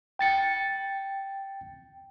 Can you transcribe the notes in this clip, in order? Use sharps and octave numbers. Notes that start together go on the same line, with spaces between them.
G5 A6 C#7